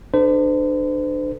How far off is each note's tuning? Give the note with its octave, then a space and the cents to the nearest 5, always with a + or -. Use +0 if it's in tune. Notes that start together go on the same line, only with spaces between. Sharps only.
D4 +30 A4 +0 C5 -40